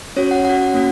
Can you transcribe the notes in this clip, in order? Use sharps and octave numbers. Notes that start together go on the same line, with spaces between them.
C#4 F#4 C#5
F#5
C#4 F#4 F#5
A#3 C#4 F#4